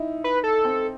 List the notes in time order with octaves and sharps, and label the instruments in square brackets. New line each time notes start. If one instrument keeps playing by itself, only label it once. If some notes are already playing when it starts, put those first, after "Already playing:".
Already playing: [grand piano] D#4 E4
[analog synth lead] B4
A4
[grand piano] C4